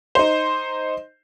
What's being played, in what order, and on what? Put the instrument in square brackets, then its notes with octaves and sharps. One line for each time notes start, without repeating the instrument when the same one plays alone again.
[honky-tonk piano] D#4 C5